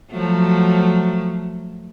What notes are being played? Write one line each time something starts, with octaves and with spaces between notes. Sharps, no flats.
F3 F#3 A3